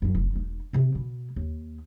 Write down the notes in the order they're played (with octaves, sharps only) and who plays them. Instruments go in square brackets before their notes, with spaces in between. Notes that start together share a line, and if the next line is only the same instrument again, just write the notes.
[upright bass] F#2 D4
F1
E1 D#4
C3 C4
B2
D#2